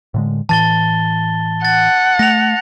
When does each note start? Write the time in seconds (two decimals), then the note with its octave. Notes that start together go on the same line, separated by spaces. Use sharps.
0.14 A2 D3 G#3
0.49 A2 E3 A5 A6 G7
1.65 F#5 A6
2.19 A3 A#6 F7